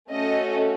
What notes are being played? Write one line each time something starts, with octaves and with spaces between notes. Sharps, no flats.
A3 C#4 F#4 A4 D#5